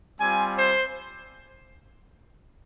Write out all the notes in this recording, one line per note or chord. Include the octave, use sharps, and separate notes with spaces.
G3 C4 F4 G#5
C5